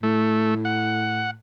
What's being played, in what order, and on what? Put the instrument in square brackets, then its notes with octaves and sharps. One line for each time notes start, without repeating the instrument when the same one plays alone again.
[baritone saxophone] A2 [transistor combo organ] A3
[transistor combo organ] F#5